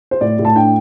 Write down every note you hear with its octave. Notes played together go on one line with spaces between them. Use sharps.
C5
A2 D5
A2
A5
D4 G5